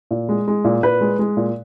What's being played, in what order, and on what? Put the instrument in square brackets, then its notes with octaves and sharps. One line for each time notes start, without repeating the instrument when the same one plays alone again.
[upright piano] A#2
G#3
G#3
A#2
A#2 B4
G#3
G#3
A#2